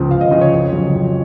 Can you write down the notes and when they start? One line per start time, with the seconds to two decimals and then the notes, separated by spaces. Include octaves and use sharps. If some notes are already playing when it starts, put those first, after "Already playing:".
Already playing: C#2 C#3 F3
0.11 C#2 F5
0.21 D#5
0.31 C#3 F3 D#5
0.41 C#5
0.52 F2
0.73 C#3 F#3
0.93 F2